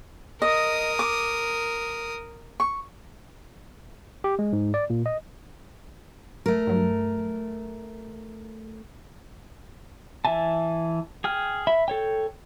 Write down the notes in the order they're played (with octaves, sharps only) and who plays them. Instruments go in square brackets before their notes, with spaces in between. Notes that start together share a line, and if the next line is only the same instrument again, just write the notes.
[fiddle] A#4 D#6 [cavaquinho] D#5
[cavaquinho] D6
C#6
[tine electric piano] G4
G#3
G#2
D5
A#2
D#5
[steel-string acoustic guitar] A3 A#4
[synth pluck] G2 F#3
[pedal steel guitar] E3 E5 G#5 A5
G#4 G5 F6
E5 B5
A4 C#5 G5